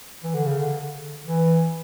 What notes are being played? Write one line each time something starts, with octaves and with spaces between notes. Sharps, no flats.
E3
D3
C#3
D3
E3